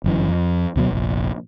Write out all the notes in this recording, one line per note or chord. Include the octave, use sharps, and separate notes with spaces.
G1 F#2 E3
F2
D2 B2 F3 F#3
F1 A#1